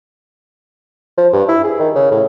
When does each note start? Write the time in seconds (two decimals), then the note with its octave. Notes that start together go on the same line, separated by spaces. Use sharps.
1.18 F3
1.33 G2
1.48 E4
1.64 G#4
1.80 D#3
1.95 C#3
2.11 A2